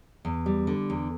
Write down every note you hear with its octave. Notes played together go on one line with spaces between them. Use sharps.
E2
G3
D3
E2